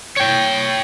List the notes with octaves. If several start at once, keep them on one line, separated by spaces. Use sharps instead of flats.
C#5 G5